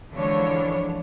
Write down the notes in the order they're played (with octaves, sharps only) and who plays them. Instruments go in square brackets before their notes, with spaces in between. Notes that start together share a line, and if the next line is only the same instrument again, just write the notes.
[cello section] D3 E3 F3 G#3 D4 C#5